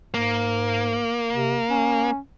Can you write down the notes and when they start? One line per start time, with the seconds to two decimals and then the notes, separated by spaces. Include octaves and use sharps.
0.14 G#2 A#3
1.35 C3
1.70 C#4